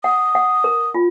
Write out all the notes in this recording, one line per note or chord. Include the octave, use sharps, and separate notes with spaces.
F#5 D#6
F#5
A#4
F4